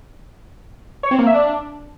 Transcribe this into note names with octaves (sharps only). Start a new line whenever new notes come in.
C#5
C4
A#3
E5
D4